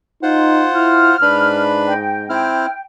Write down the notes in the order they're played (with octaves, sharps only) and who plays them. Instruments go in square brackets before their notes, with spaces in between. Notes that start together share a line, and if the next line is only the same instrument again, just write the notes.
[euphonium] D#4 [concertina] F4 C5 F#5
[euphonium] E4 [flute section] F6
[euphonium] G#2 [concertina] D4 B4 B5
[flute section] D#5 G5
[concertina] C4 E4 F6 [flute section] G5